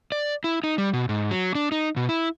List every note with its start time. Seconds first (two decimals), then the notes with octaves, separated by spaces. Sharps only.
0.12 D5
0.44 E4
0.64 D#4
0.78 G3
0.93 B2
1.09 G#2
1.31 F#3
1.55 D4
1.72 D#4
1.96 B2
2.09 E4